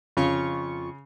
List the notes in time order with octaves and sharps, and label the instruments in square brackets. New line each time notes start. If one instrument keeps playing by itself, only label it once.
[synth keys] F2 F4 C#6 [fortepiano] C#3